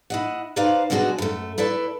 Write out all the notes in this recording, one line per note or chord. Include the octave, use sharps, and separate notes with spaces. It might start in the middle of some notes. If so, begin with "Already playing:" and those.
E4 D#5 F#5
D#4 B4 C5 D5 F5
B2 F#3 G#3 D4 F#4 G#4
F#2 A3
E4 A4 B4 D5